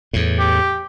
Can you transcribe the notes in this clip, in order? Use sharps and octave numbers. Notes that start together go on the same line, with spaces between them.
E2 A2
G4